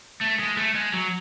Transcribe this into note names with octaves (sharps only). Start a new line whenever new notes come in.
A3
G#3
A3
G#3
F#3